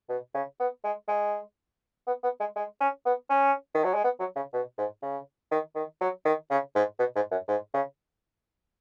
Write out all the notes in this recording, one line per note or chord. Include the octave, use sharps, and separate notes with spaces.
B2
C#3
B3
G#3
G#3
B3
B3
G#3
G#3
C#4
B3
C#4
D#3
F#3
G#3
B3
F#3
C#3
B2
G#2
C#3
D#3
D#3
F#3
D#3
C#3
G#2
B2
G#2
F#2
G#2
C#3